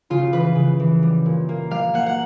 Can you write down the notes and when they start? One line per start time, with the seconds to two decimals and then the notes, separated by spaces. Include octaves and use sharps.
0.10 C#3 F4
0.32 E3 B4
0.55 C#3
0.80 E3
1.03 G3
1.26 A#2
1.49 A#3
1.71 G3 F5
1.94 A#3 F#5
2.06 F#5